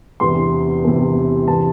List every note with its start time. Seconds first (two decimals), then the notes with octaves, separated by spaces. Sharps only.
0.20 E1 E2 C3 E3 C6
0.84 E1 E2 C3 E3
1.47 E2 C3 E3 A5